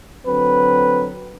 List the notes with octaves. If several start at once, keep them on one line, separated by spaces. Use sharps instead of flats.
D3 F#3 C4 B4